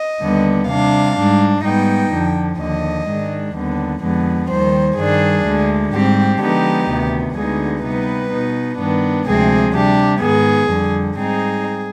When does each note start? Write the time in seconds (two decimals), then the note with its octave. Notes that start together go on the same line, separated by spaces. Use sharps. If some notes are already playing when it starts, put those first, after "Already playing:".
Already playing: D#5
0.20 D#2 D3 G3 B3
0.69 C3 G3 D4 F5
1.16 G#2 G3 D4
1.63 G#2 G3 B3 D#4 G5
2.11 F2 D3 F3
2.59 D#2 D3 F3 D#5
3.07 G#2 D#3 G#3 D4
3.55 D#2 D3 G3 B3
4.02 F2 D3 F3 G#3 B3
4.49 D#2 D#3 G3 C5
4.97 G2 D#3 G3 D4 G#4
5.45 D2 D3 G#3
5.92 G#2 G3 C4 G4
6.40 D3 F3 G#3 B3 D#4 G4
6.88 D2 C3 D#3 B3
7.36 D2 D3 G#3 B3 D#4 G#4
7.83 C3 G3 B3 D#4 B4
8.31 B2 B3 D#4
8.79 G2 D#3 B3 D4
9.27 D2 C3 F3 G#3 C4 G#4
9.74 C3 G3 D4 G4
10.21 G#2 D#3 B3 G#4
10.69 F2 D3 G3
11.17 G#2 G3 C4 D#4 G#4